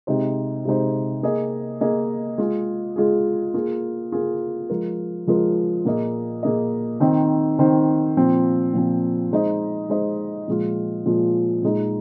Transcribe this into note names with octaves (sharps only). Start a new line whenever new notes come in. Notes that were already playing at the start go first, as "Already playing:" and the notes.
C3 G#3 D#4 C5
C3 G#3 D#4 C5
A#3 G#4 D#5
A#3 G#4 D#5
G#3 F4 G#4
G#3 F4 G#4
A#3 F4 G#4
A#3 F4 G#4
F3 G#3 F4 A#4
F3 G#3 F4 A#4
A#2 A#3 G#4 D#5
A#2 A#3 G#4 D#5
D#3 C4 D#4 C5
D#3 C4 D#4 C5
A#2 F3 C4
A#2 F3 C4
G#3 D#4 C5 D#5
G#3 D#4 C5 D#5
A#2 F3 G#3 F4
A#2 F3 G#3 F4
A#2 G#3 D#4